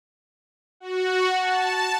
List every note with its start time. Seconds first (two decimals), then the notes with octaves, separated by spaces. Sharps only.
0.80 F#4
1.37 A5